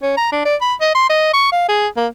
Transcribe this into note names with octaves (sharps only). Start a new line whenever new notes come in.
C#4
A#5
D4
D5
B5
D#5
C6
D#5
C#6
F5
G#4
A#3